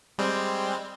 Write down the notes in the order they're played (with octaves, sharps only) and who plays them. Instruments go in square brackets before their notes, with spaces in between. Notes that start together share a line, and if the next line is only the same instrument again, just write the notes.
[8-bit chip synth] G3 G#3 C4